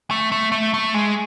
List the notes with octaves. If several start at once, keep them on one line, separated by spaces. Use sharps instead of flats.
A3
A3
A3
A3
G#3